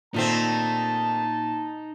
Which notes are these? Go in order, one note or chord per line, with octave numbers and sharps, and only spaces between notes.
A#2 D#3 A3 C4 D#4 A5